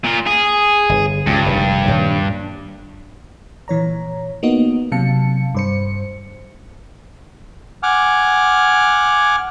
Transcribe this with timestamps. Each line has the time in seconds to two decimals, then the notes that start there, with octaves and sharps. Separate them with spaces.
0.04 A#2 F4
0.27 G#4
0.89 G1
1.27 C#2 G2
1.45 F1 D#2
1.88 D#2 A#2 G3
3.68 A#2 E3 C#5 A#5
4.43 A#3 B3 D#4 F#4 D#5
4.92 C3 F#3 F5 A5 C#7
5.55 G2 C5 C#7
7.83 F#5 G#5 D6 F6